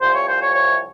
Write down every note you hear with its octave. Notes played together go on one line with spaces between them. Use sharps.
C2 C3 F3 C5
C#5
C5
C#5
C#5